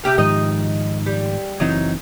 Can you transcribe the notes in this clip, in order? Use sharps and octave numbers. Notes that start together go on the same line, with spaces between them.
C3 G4 F5
G#2 D#3 F3 D#4 D#5
G3
F#1 E3 F#3 C4 D#4